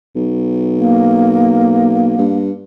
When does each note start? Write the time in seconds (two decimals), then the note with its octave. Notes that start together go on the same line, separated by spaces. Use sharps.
0.16 B1
0.77 A#3
2.18 G2